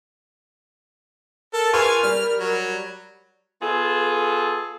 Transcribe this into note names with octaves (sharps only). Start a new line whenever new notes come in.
A4 A#4
F4 G#4 B4 F5 G#5 C#6
G3 F6
F#3
B3 F4 G#4 A4